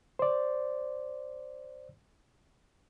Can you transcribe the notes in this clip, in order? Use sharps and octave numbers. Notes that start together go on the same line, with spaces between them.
C5 D5